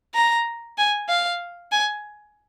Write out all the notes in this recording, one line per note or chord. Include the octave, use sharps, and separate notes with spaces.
A#5
G#5
F5
G#5